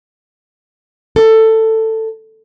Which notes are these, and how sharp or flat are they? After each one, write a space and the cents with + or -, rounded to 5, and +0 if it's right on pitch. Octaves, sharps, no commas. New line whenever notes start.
A4 +15